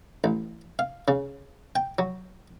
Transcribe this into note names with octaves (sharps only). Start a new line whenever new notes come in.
A1
F5
C#3
G5
F#3